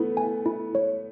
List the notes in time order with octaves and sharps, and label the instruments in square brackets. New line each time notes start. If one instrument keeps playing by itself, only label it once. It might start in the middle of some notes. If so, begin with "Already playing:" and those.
Already playing: [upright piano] A3 B3 [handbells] E4
[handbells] G#5
E4
C#5